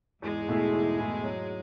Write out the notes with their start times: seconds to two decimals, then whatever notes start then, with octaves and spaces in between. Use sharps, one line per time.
0.22 E2 G#2 G#3
0.48 B2 A3 E4 G#4
0.74 E2
0.98 B2 A3 E4 G#4
1.24 F#3